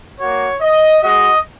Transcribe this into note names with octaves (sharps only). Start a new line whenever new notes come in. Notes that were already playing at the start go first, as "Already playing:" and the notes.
A#3 F#4 C#5
D#5
G#3 F#4 D#5